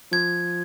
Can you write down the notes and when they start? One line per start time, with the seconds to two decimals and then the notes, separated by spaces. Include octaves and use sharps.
0.12 F3 G#6